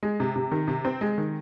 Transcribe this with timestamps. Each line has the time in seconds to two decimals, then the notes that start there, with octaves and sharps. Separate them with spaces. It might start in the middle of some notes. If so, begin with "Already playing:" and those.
0.03 G#3
0.20 C3
0.36 C3
0.52 D#3
0.68 C3
0.85 C4
1.01 G#3
1.18 D#3